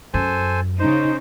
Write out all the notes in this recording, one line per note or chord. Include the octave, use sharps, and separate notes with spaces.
F#2 A4 C5 G#5
C#3 D#4 C5